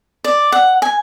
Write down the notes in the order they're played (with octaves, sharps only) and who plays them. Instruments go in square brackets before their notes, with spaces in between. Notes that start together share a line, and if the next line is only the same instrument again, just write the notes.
[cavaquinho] D5
F#5
G#5